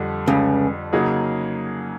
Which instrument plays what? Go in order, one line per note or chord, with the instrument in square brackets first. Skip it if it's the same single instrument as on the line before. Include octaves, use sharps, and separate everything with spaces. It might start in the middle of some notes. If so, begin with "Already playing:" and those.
Already playing: [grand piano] F2 D3 G3
[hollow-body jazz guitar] C#2 C#3
[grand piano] C#3 F#3 A#3 D#4 G#4